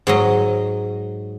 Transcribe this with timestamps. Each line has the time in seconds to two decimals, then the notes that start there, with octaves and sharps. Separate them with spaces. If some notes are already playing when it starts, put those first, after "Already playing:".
0.07 G#2 F#3 D#5